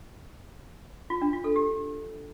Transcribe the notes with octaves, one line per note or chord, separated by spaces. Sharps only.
F4
D4
F4
A4
G4